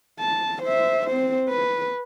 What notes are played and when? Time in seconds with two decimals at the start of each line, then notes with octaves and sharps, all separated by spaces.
0.20 A5
0.63 C5 E5
1.07 C4 C5
1.49 B4